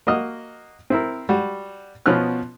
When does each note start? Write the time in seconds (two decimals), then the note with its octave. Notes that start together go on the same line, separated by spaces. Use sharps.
0.07 A#3 F#4 D#5 F6
0.90 C4 E4 A#4
1.29 G3 F#4
2.06 B2 F3 B3 C#4 F6 F#6